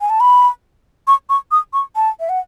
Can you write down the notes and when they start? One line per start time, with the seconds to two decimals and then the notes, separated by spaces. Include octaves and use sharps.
0.01 G#5
0.09 A5
0.20 B5
1.07 C#6
1.29 C#6
1.51 D#6
1.73 C#6
1.96 A5
2.20 E5
2.29 F#5